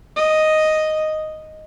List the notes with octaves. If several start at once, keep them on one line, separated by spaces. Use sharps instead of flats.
D#5